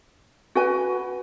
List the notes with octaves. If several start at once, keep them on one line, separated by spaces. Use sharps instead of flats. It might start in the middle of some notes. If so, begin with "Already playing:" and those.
F#4 B4 G#5